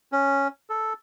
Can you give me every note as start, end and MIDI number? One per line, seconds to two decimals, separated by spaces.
0.12 0.48 61
0.70 0.93 69